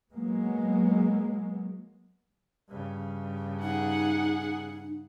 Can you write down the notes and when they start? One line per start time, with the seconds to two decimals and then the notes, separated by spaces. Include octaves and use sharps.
0.13 F#3 G#3 A#3 B3
2.68 G2 C#3
3.63 D#4 G#4 F#5